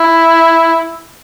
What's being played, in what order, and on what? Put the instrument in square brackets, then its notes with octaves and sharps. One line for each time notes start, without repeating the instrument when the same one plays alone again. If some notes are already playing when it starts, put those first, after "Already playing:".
Already playing: [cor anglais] E4